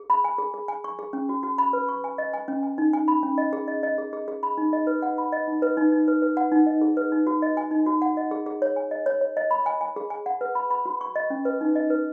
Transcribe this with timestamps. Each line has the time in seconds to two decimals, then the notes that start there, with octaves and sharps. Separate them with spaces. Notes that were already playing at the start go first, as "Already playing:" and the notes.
Already playing: G#4
0.10 B5
0.24 G#5
0.38 G#4
0.54 G#4
0.68 G#5
0.84 C#6
0.99 G#4
1.13 C#4
1.29 F#4
1.43 F#4
1.58 B5
1.73 B4
1.89 C#6
2.04 G#5
2.18 D#5
2.33 G#5
2.48 C#4
2.63 G#5
2.78 D#4
2.93 G#5
3.08 B5
3.23 C#4
3.38 D#5
3.53 G#4
3.68 D#5
3.83 D#5
3.98 G#4
4.13 G#4
4.28 G#4
4.43 B5
4.58 D#4
4.73 D#5
4.87 B4
5.02 F#5
5.18 B5
5.32 D#5
5.48 D#4
5.62 B4
5.77 D#4
5.92 D#4
6.08 B4
6.22 B4
6.37 F#5
6.52 D#4
6.66 D#5
6.81 G#4
6.97 B4
7.12 D#4
7.27 F#4
7.42 D#5
7.57 G#5
7.71 D#4
7.86 F#4
8.02 F#5
8.17 D#5
8.31 G#4
8.46 G#4
8.62 C#5
8.76 G#5
8.91 D#5
9.06 C#5
9.21 C#5
9.37 D#5
9.51 B5
9.66 G#5
9.81 G#5
9.96 G#4
10.10 G#5
10.26 F#5
10.41 B4
10.55 B5
10.70 B5
10.86 F#4
11.01 C#6
11.16 D#5
11.30 C#4
11.45 B4
11.61 D#4
11.75 D#5
11.90 B4